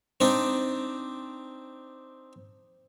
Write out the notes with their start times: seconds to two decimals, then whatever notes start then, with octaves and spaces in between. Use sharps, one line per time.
0.20 C4 D4 D#4